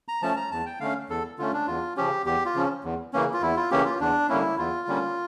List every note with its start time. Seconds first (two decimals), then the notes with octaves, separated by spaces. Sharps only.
0.08 A#5
0.22 F3 A3 C#4 A5
0.37 A#5
0.52 E2 A5
0.66 G5
0.80 D3 A3 C#4 F5
1.10 E2 A4
1.38 D3 A3 C#4 F4
1.53 D4
1.67 E2 F4
1.97 C#3 F3 C#4 G4
2.25 E2 G4
2.46 F4
2.55 C#3 F3 C#4
2.84 E2
3.13 C#3 E3 A#3 C#4
3.34 F4
3.42 E2 E4
3.57 F4
3.71 C#3 E3 A#3 C#4 G4
3.85 F4
4.00 E2 D4
4.29 D3 G3 A#3 C#4 E4
4.58 E2 F4
4.88 D3 G3 A#3 C#4